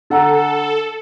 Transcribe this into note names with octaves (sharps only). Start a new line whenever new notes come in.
D3 A4 F#5 A#5